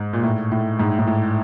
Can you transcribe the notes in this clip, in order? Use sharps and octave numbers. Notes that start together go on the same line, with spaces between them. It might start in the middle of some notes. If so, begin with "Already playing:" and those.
Already playing: G#2
A#2
A2
A2
G#2
G#2
A2